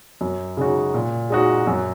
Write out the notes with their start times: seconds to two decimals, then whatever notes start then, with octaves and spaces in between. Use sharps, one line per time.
0.21 F#2
0.57 C#3 G#3 D#4 F#4
0.94 A#2
1.30 G#3 D#4 F#4
1.67 F#2